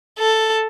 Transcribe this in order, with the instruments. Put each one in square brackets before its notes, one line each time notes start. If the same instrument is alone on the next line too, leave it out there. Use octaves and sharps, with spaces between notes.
[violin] A4